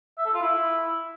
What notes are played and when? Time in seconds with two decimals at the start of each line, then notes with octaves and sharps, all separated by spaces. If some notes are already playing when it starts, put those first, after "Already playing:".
0.18 E5
0.26 A4
0.34 F4
0.42 E4